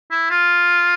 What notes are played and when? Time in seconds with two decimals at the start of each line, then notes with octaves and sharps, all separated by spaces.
0.11 E4
0.30 F4